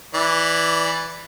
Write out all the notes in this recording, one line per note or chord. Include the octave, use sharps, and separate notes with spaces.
E3 D5